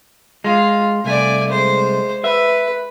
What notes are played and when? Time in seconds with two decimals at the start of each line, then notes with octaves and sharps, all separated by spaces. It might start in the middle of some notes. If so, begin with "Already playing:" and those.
0.44 G#3 F4
1.05 C2 A3 D5 G#5
1.50 G#3 C5
2.24 B4 E5